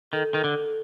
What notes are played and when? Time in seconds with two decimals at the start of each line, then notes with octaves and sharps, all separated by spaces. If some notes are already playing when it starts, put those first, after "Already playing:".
0.13 D#3 A4
0.34 D#3
0.44 D3